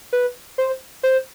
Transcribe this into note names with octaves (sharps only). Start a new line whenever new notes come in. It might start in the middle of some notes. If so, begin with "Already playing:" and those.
B4
C5
C5